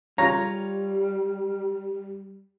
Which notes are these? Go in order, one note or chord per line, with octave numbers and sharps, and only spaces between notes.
G3 F4 C#5 A#5